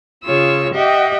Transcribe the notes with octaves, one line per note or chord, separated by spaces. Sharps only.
C#3 F4 G#4 C#5 E6
G4 D#5 E5 F#5 G5